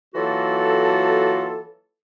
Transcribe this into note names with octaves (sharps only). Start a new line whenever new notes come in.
E3 F#3 A#3 F4 F#4 A4